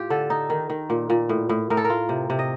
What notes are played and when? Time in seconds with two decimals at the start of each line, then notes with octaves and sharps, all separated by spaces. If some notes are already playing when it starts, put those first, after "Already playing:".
Already playing: A2 F4 G4
0.10 D3 A4
0.30 D#4
0.50 D#3
0.70 D#3
0.90 A#2
1.10 A#2
1.29 A2
1.49 A2
1.70 A2 A#4
1.77 A4
1.84 A#4
1.90 F4
2.09 C3
2.30 C3
2.39 D#5